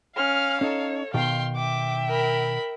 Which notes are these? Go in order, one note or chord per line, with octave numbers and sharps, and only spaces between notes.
C#4 F5 F6
C#4 D#4 A4 C#5
B2 D#3 F5 G5 C6
E5 G5 D6
A#4 B5